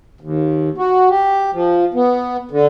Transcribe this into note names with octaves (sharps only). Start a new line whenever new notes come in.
D#2
F#4
G4
F3
B3
D3